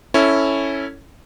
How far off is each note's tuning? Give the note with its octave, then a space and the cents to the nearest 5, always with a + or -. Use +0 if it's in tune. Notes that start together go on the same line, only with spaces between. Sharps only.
C#4 +0 E4 -5 A4 +15